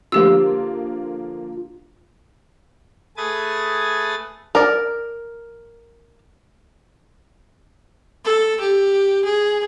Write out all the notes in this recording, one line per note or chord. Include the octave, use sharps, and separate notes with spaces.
D3 F3 A#3 F4 G4 E6
A3 G#4 B4 G#5 D#6 A6
A#4 D5
A4
G4
G#4